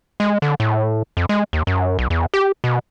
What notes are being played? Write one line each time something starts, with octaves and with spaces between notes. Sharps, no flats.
G#3
D3
A2
F2
G#3
D#2
F#2
B1
E2
G4
B2